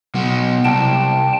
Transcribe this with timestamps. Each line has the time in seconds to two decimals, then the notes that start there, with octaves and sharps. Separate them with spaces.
0.15 B2 F#3 B3
0.64 C2 G5 A5